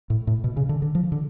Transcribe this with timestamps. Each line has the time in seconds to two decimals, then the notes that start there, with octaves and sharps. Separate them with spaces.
0.10 A2
0.27 A2
0.44 B2
0.57 C#3
0.69 D3
0.82 D3
0.95 F3
1.12 D3